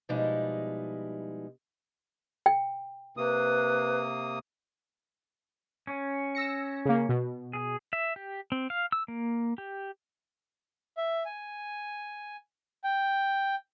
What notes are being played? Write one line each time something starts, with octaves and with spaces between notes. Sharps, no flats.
B2 F3 G3 G#3 D#4 E4
G5
C3 A#3 B4 D#6
C#4
E6 A#6 C#7
C#3 A#3
B2
G#4
E5
G4
C4
F5
E6
A#3
G4
E5
G#5
G5